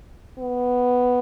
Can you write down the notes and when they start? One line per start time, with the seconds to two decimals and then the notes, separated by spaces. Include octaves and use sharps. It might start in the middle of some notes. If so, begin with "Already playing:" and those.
0.39 B3